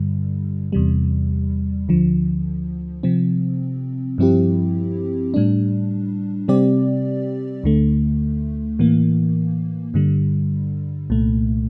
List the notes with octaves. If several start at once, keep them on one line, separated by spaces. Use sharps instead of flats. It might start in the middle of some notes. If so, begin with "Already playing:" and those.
Already playing: G2 D3 G3
E2 C3 G3
D2 D3 F3
C3 F3 C4
G2 F3 C4 E4 G4
A2 G3 D4
C3 G3 C4 G4 D5
D2 D3 A3
A2 E3 A#3
G2 D3 G3
C2 A#2 A3